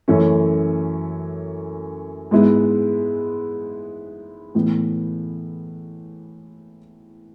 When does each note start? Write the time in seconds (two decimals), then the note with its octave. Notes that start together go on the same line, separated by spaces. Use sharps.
0.08 F#2 E3 A3 C#4
2.31 G#2 G#3 B3 E4
4.55 A2 E3 B3